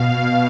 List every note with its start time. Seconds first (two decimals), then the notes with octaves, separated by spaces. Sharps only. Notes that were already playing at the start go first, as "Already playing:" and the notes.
Already playing: B2 F5